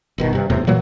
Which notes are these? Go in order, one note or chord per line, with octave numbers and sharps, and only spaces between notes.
G1 B2 D#3
G2 C3
D#1 E2 A2 C3
A#2 E3 F#3 A#3